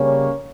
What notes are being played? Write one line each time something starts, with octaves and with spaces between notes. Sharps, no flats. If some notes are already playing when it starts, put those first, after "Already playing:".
Already playing: C#3 G3 A#3 C#4